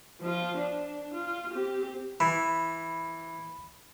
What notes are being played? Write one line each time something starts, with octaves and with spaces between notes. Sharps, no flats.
F3 F4
D4
F4
C4 G4
E3 B5